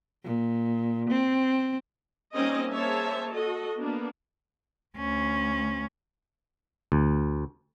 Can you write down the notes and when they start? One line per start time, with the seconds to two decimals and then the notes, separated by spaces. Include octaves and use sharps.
0.23 A#2
1.10 C4
2.33 G3 A#3 C4 C#4 D#4 D#5
2.70 A#3 G#4 C5 C#5 E5 A5
3.31 F#4 A4 D#5
3.78 A#3 B3 D4
4.98 D2 C#4
6.92 D2